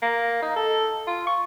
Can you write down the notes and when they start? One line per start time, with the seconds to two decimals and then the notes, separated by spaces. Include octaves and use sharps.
0.02 A#3
0.42 D#4
0.56 A4
1.07 F4
1.27 C#6